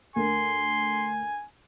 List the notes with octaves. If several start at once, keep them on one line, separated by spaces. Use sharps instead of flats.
D2 A#4 G#5 C6